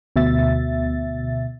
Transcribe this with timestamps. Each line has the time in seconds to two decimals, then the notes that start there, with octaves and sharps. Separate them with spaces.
0.16 D2 B2 E5 A6